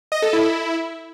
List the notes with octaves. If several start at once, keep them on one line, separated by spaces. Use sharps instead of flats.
D#5
A4
E4